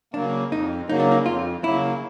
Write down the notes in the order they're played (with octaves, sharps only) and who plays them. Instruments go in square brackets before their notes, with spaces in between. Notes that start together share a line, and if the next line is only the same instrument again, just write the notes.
[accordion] C#3 F#3 A#3 [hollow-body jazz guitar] D4
[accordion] F2 [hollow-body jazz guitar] D#4
[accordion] C#3 F#3 A#3 [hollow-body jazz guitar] D#4
[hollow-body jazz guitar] D4
D#4
[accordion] F2 [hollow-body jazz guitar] F4
[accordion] C#3 F#3 A#3 [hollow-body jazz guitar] E4